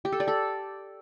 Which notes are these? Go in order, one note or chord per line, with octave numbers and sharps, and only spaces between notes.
G4
A4
D5
A4